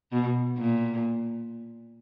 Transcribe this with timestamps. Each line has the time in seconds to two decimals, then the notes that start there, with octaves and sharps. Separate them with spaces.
0.12 B2
0.58 A#2